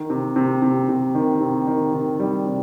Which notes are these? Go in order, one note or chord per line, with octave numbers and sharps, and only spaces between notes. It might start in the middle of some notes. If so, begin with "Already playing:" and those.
Already playing: D#3
C3
C3
C3
C3
D#3
C3
D#3
D#3
G3
C3